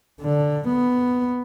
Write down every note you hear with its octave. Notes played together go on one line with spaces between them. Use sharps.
D3
B3